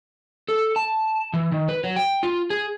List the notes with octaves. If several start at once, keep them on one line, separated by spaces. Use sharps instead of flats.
A4
A5
E3
D#3
B4
F#3
G5
F4
G#4